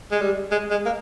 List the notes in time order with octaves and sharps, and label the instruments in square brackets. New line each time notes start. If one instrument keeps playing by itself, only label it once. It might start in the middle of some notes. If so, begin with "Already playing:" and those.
[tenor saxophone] G#3
G3
G#3
G#3
A#3